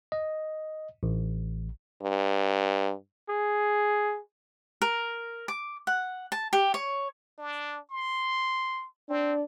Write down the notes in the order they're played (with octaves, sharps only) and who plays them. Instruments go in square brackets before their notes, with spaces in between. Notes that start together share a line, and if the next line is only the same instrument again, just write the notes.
[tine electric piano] D#5
A1
[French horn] G2
[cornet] G#4
[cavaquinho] A#4
D6
F#5
A5
G4
C#5
[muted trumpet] D4
C6
[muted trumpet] C4 [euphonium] D4